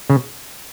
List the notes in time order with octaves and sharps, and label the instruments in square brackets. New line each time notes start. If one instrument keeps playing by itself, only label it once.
[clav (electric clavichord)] C#3